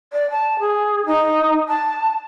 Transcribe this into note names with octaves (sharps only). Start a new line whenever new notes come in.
D5
A5
G#4
D#4
A5